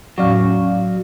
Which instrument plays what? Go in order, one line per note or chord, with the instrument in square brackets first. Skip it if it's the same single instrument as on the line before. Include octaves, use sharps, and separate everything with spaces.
[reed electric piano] E2 C#4 C#6 [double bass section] A2 [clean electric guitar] F#3 [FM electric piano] F#4 D5 F5